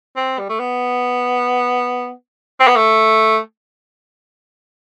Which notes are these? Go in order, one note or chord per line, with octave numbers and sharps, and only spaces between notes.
C4
G3
A3
B3
C4
B3
A3